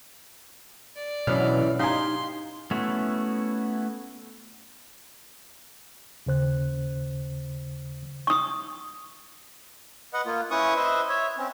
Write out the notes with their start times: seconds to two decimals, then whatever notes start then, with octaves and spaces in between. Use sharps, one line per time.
0.96 D5
1.27 B2 E3 F#3 C#4 D4 F6
1.79 D#4 G4 F5 G#5 C6
2.71 A3 B3 C#4 E4 F#4
6.26 D#2 C#3 C5 F#6
8.27 C#6 D#6
10.13 B4 D#5 F#5
10.26 A#3 F4
10.51 C#4 E4 B4 C#6 D#6
10.76 B4 C5 D#5 E5
11.09 C#5 E5
11.38 C4 C#4